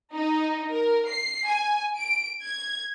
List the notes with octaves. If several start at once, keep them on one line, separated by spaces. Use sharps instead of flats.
D#4
A#4
C7
G#5
D7
G#6